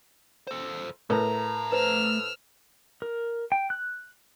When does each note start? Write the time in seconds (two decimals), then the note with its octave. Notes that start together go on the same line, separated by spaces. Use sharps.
0.47 A4 C5
1.10 A2 A3 A#4 B4 E5 A#5
1.72 B4 C5 E6 F6
3.02 A#4
3.52 G5
3.70 F#6